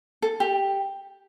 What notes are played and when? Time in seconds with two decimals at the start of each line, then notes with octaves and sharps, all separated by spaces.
0.22 A4
0.40 G4